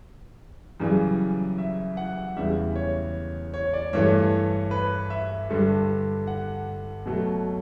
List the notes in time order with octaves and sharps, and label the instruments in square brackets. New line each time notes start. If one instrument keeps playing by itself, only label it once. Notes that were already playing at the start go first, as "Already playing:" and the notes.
[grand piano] F#2 C#3 E3 G3
E5
F#5
E2 C#3 G3 E5
C#5
C#5
D5
G2 E3 A3 C#5
B4
E5
G2 D3 G3
F#5
B2 F#3 A3